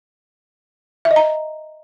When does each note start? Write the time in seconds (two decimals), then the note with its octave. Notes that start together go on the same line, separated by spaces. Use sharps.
1.05 E5
1.11 D#5
1.16 A#5